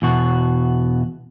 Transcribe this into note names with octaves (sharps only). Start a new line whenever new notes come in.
E2 B2 F#4